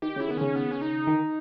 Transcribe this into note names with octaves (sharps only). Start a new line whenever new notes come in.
D#3 G4
C#3
E4
D#3
B3
C#3 C#4
B3
C#4
D#4
D#3